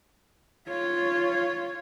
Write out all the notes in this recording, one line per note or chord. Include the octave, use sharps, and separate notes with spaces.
F4 C#5